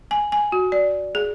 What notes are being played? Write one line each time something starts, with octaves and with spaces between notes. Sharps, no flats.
G#5
G#5
F#4
D5
G#4